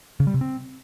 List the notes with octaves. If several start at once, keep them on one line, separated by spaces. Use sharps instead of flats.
C#3
G3
C3
C4